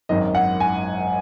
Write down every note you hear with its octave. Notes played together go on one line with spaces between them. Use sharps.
G#1 F#2 D#3 D#5
F#5
G#5